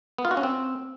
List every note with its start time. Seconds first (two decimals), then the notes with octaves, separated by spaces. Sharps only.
0.18 B3
0.25 F4
0.31 F#4
0.37 C#4
0.43 C4